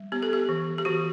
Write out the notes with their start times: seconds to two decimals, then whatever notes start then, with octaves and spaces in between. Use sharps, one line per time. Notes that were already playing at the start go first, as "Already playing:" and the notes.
Already playing: G3
0.12 B3 G4
0.23 A4
0.33 G4
0.49 E3
0.78 G4
0.85 E3 F#4